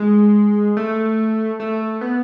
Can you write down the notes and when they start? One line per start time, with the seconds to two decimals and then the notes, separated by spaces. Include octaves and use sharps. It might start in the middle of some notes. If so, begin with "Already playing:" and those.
Already playing: G#3
0.77 A3
1.60 A3
2.01 B3